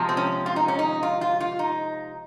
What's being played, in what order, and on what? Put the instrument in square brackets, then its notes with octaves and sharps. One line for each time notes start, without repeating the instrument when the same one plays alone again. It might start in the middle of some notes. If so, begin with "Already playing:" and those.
Already playing: [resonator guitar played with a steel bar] C3 F3 G#3
C4
C#4
F4
D#4
C#4
D#4
F4
F4
F4
D#4